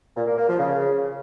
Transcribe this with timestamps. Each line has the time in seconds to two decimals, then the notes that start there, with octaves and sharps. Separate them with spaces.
0.16 A#2
0.27 A#3
0.37 A#3
0.48 F3
0.59 C#3